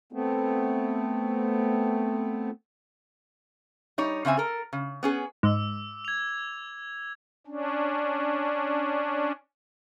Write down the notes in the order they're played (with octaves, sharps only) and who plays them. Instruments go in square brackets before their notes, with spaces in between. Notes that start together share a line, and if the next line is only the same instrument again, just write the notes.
[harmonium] A3 B3 C4
[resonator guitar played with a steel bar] G3 D#4 C#5
C#3 C4 E5 G#5
A4 A#4
C#3
B3 C#4 G#4
[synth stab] G#2 [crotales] D6 E6
[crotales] G#6 F7
[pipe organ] C#4 D4